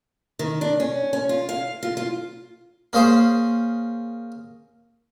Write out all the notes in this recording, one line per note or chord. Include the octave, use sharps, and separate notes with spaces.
D#3
D4
C#4
C#4
F4
F5
F4
F4
A#3 C#4 G#4 C5